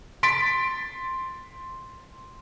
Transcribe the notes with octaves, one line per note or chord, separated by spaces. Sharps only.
C6 A6 B6 D7